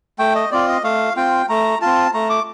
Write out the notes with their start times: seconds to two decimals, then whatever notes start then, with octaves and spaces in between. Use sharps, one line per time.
0.19 A3 G5
0.35 D#5
0.51 C4 F4 D5
0.68 D#5
0.84 A3 F5
1.16 C4 F4 G5
1.49 A3 A#5
1.81 C4 F4 A5
2.14 A3 A#5
2.30 D6